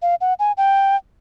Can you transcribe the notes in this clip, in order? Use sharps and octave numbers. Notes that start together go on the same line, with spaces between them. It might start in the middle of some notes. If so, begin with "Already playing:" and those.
F5
F#5
G#5
G5